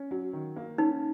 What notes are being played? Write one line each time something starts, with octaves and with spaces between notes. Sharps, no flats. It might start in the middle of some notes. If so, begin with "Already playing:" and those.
Already playing: C#4
F#3
D#3
A#3
C#4 D#4